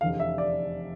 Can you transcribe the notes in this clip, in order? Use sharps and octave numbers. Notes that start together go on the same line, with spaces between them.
F1 E2 D3 F5
E5
D5